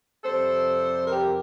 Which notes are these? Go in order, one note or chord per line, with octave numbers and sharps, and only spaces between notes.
F2 C3 G3 A4 C5
G4 A#4